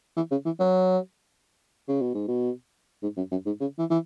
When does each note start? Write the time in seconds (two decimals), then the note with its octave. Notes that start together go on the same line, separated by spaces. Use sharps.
0.17 E3
0.31 C#3
0.45 E3
0.59 F#3
1.88 C#3
2.02 B2
2.14 G#2
2.28 B2
3.03 G#2
3.17 F#2
3.31 F#2
3.46 G#2
3.60 C#3
3.79 E3
3.90 E3